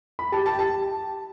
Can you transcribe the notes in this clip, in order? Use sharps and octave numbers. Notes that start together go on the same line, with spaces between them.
B5
G4 A5
A5
A5